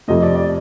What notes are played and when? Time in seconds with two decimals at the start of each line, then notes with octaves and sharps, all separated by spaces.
0.08 F2 C3 F3 A3 D#5
0.22 D5
0.35 D5